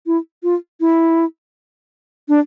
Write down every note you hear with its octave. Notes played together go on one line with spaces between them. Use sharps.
E4
F4
E4
D4